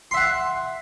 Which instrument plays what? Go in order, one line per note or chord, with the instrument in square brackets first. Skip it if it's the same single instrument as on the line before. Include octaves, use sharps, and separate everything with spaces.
[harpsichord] C6
E5
F#5